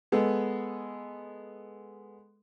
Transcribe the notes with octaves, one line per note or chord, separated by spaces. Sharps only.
G#3 B3 A4